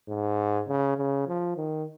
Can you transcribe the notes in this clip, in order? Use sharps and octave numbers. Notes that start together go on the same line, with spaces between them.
G#2
C#3
C#3
F3
D#3